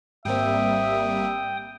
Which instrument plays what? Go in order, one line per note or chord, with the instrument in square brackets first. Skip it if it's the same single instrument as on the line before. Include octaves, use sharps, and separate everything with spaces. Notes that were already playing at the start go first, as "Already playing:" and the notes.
[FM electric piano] G#1 C4 [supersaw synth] G3 A#3 [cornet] E5 [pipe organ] G5 D#6